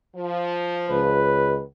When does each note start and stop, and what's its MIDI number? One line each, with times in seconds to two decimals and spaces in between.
0.16 1.21 53
0.89 1.60 37
0.89 1.64 71